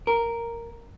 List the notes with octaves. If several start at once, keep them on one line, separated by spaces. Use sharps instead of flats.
A#4